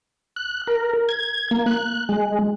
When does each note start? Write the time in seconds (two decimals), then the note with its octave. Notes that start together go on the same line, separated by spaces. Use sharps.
0.36 F#6
0.67 A#4
1.09 G#6
1.51 A#3
1.66 F#6
2.09 G#3